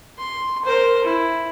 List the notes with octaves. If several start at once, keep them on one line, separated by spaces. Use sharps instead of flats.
C6
A#4 C5
E4